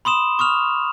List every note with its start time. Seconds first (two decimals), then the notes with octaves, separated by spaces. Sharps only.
0.05 B5 C6 D#6 E7
0.39 C#6 D#6 F6 F7